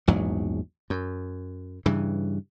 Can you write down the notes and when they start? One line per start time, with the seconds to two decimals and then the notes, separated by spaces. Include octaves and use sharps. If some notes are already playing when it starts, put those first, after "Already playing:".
0.07 A#1 E2 G#2 F#3
0.90 F#2
1.86 G2 C#3 E3